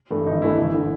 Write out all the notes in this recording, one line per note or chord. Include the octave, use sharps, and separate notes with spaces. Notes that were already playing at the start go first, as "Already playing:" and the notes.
G2 E3 A3
G#1 D#4
G2 E3 A3 E4
F#1
D3